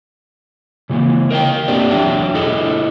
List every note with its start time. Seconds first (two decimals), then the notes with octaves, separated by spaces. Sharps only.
0.90 C#3 E3 A#3
1.31 A#4 D#5 F5 G5
1.68 A3 A#3 C4 D4 G4 D5
1.91 E2 F#3 D4 E5 G5
2.34 E4 G#4 A4 D#5